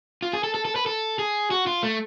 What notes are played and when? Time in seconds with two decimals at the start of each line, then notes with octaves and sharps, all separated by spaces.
0.22 F4
0.33 G#4
0.44 A4
0.54 A4
0.65 A4
0.76 B4
0.86 A4
1.19 G#4
1.51 F#4
1.67 F4
1.83 A3